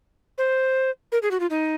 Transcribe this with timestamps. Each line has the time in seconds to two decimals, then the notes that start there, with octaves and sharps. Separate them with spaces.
0.38 C5
1.12 A#4
1.22 G#4
1.31 F#4
1.40 F4
1.50 D#4